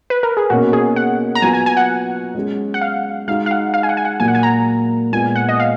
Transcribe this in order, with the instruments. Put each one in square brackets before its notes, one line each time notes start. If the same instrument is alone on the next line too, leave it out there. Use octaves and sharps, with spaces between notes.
[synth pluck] B4
A#4
G#4
[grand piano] B2 A#3 C#4 [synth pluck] F#4
[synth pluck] G#4
F#5
A#5
[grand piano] F#3 B3 F4 [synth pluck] G#5
[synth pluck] G#5
G#5
F#5
[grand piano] G#3 C#4 G#4
[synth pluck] F#5
F5
[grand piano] G#3 D#4 F#4 [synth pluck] F5
[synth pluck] F5
F#5
F5
G#5
F#5
G#5
F#5
[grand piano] A#2 F#3 A#3 [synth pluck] G#5
[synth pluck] F#5
G#5
A#5
[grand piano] A#2 G#3 B3 F4 [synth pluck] G#5
[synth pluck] F#5
D#5
F5